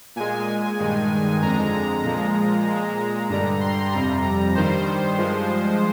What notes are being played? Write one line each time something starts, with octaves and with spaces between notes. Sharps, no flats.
A#2 G#3 G#5
G2 D#3 G#3
F2 D3 G#3 A#5
A#5
A#2 F3 G#3
A#2 G#3
G2 D3 G3 A#5
C6
F2 C3 G3 A#5
A#5
G2 D#3 G3 C5
G2 F3 G#3